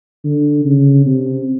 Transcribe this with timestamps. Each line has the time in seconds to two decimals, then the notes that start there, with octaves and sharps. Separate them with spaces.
0.25 D3
0.65 C#3
1.06 C3